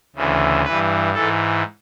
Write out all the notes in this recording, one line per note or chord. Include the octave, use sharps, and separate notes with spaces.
D2 C#3 E3
G2 E3 B4
G#2 E3 A4